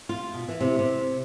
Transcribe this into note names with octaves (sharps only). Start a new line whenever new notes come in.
F4
B2
E3
C3
C3